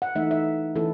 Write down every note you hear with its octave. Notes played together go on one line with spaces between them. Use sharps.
F#5
E3 A3 D#4 E5
E5
E3 A3 C#4 E4 A4